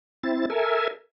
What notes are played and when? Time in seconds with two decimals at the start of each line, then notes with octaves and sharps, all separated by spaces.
0.23 C4 E4 A6
0.50 A4 A#4 E5 G#5